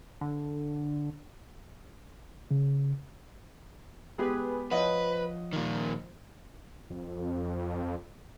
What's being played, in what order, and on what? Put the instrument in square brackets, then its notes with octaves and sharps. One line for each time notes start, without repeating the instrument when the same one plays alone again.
[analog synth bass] D3
[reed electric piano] C#3
[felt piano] G#3 B3 G4 [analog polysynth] G#4 B4
[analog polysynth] F3 [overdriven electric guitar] B4 [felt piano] C#5 D#5 F#5
[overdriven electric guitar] A#2 D#3
[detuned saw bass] F2